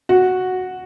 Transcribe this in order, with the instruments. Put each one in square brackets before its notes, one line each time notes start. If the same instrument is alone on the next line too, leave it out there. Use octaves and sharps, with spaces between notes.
[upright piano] F#4